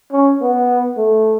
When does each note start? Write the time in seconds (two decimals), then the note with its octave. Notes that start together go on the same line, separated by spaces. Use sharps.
0.12 C#4
0.41 B3
0.97 A3